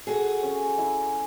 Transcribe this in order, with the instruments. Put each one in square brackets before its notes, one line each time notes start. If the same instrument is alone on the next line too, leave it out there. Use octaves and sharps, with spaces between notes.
[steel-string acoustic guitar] F#4 G#4 [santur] A4
[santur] C#4
E4